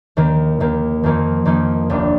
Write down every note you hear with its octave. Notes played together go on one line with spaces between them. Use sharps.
D#2 D#3 A#3
D#2 D#3 A#3
F2 D#3 A#3 D#4
F2 D#3 A#3 D#4
F1 D#2 D#3 A#3 D4